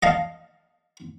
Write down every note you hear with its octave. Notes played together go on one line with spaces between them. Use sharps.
D#5 F5 A5